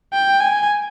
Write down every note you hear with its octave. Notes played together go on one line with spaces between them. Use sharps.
G5
G#5